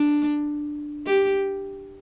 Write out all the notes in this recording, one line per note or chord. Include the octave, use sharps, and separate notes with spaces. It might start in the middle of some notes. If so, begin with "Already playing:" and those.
Already playing: D4
G4